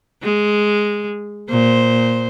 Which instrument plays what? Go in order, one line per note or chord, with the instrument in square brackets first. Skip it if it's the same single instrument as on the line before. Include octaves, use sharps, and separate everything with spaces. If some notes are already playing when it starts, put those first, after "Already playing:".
[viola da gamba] G#3
A#2 C5